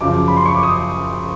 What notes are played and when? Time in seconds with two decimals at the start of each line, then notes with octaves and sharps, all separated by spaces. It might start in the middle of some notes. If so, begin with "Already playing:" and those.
0.01 F#2 C#3 F3 D6
0.28 B5
0.36 C6
0.46 C#6
0.54 D6
0.63 D#6